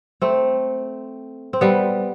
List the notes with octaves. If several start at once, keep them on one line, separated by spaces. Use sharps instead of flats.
A3 C4
C4
G3 B3